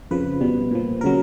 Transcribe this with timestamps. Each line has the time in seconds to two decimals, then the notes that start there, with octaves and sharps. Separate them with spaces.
0.11 F2 C#3 F3 B4
0.41 B2 G3
0.71 A#2 F3
1.01 C#3 F#3 A#4